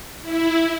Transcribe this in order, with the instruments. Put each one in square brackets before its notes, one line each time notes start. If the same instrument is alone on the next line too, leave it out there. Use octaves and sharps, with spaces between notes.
[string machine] E4